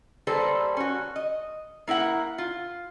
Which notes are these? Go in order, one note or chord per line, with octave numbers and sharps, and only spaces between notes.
G3 A#3 A4 B4 C5
C#4 F#4
D#5
A#3 E4 A#4 F#5
F4